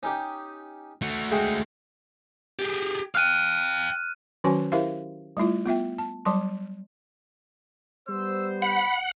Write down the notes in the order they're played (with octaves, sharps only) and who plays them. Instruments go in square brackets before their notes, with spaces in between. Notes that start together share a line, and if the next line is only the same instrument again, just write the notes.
[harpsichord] C#4 D#4 G4
[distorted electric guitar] A3 F#4
[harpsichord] G#3 E5 G5
[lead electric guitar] G4 G#4
[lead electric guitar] F5 G5 [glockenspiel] F6 F#6 D#7
[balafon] D#3 F#3 C#4 F#4 C5 G#5
E4 G4 A#4 C5 E5 F5
G3 A3 E4 F4
B3 F4 E5 G5
A5
F#3 G3 A5 C6
[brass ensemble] G3 B3 C5 [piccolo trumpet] E6
[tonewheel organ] F#5 [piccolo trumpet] B5